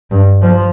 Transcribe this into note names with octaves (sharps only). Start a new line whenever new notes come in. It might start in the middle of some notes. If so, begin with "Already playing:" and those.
G2
F3